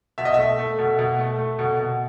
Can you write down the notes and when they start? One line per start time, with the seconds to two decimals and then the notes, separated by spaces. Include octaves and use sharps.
0.18 B2 E5
0.25 D#5
0.34 A3 E5
0.58 A3
0.78 B2
0.99 B2
1.19 A3
1.39 A3
1.59 B2
1.79 B2